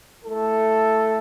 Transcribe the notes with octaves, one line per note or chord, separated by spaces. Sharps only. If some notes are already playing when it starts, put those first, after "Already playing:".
A3 E4 A4